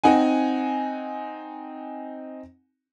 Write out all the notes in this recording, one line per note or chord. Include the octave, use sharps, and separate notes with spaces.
C4 D#4 F#5 G#5